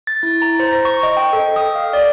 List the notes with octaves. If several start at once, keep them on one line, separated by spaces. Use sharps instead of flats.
A6
E4
A#5
C5
A#6
C#6
D#5
G5
A4
D#6
F5
D5